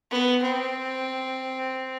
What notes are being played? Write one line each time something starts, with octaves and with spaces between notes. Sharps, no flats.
B3
C4